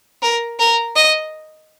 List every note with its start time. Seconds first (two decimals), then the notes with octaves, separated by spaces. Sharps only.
0.22 A#4
0.59 A#4
0.96 D#5